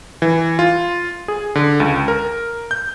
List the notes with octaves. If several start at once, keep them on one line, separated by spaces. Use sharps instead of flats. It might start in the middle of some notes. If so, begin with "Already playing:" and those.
E3
F4
G#4
D3
C#2
A#4
G6